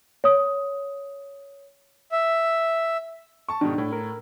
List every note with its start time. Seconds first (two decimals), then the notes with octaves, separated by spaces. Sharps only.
0.24 C#5 D#6
2.12 E5
3.49 A5 C#6
3.61 G#2 B2 D#3 D4
3.78 A2
3.92 A#4